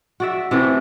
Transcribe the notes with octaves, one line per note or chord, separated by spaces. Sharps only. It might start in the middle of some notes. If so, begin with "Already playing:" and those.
F#4 D5 E5
C3 E3 A3